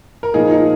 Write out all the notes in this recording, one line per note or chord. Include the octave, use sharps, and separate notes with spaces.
A#4
A#2 F3 A#3 D#4 G#4
D#4